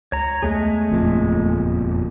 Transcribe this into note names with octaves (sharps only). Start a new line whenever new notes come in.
C#2 C#5 A#5
E2 G#3 A3 G#4
F#1 F2 A#2